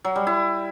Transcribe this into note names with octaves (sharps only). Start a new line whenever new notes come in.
F#3
G3
E4